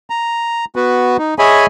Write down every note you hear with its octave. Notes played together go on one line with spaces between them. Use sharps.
A#5
B3 F#4 B4
D#4
G#4 C#5 D#5 E5 G#5 B5